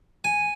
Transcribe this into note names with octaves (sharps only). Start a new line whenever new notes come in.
G#5